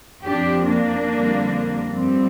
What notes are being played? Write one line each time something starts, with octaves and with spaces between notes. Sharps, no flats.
F2 F3 D4 G4
A#3 D4
F2 D3 G3
G2 F3 G3 C4